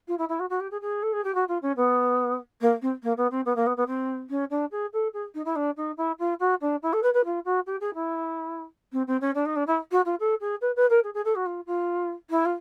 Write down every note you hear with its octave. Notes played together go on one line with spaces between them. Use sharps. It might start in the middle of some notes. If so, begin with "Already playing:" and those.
F4
E4
E4
F#4
F#4
G4
G#4
G#4
A4
G#4
G4
F#4
F4
C#4
B3
A#3
C4
A#3
B3
C4
B3
A#3
B3
B3
C4
C#4
D4
G#4
A4
G#4
D#4
E4
D4
D#4
E4
F4
F#4
D4
E4
A4
B4
B4
F4
F#4
G4
G#4
E4
C4
C4
C#4
D4
D#4
D4
E4
F#4
F4
A4
G#4
B4
B4
A#4
G#4
G#4
A4
F#4
F4
F4
E4
F4